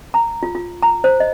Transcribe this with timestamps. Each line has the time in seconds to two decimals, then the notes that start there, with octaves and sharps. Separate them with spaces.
0.14 A#5
0.43 F4
0.55 F4
0.83 A#5
1.04 C5
1.20 D#5